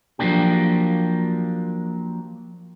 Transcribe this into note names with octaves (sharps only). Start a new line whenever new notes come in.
F3 F#3 A#3 D4 G4